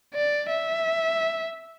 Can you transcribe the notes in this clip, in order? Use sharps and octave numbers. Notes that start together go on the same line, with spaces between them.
D5
E5